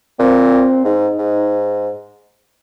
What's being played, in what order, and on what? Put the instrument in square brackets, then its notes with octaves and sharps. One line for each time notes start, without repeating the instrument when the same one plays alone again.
[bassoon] A#2 [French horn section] C4
[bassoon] G#2 [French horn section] D#4
[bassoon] G#2